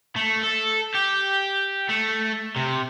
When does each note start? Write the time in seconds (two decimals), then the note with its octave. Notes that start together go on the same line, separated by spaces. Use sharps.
0.16 A3
0.44 A4
0.94 G4
1.89 A3
2.56 C3